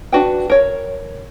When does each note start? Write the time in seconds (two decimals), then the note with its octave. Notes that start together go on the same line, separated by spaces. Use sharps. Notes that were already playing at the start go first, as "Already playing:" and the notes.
0.12 D4 F#4 B4 G5
0.50 A#4 C#5